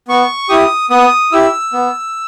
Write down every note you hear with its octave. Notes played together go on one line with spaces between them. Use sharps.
B3 C#6
E4 G4 D#6
B3 D#6
E4 G4 E6
B3